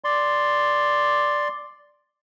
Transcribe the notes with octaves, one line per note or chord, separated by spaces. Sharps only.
D5 C6